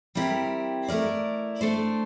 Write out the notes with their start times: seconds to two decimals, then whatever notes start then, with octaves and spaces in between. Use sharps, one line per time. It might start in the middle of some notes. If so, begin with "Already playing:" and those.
0.15 G3 C4 E4 G4 A#4
0.88 A3 E4 A#4 D5
1.61 A3 D4 A4 C5